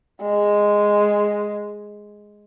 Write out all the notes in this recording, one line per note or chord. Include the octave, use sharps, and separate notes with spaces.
G#3